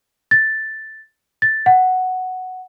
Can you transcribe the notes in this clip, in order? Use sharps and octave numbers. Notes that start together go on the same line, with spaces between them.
A6
A6
F#5